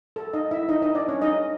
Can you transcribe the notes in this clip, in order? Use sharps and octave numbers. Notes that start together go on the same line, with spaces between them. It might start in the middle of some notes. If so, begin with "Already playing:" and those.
A4
D#4 D#5
E4 E5
D#4 D#5
D#4 D#5
D4 D5
C#4 C#5
D#4 D#5